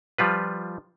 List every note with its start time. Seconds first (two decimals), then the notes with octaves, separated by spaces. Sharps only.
0.18 F3 G3 F4 B4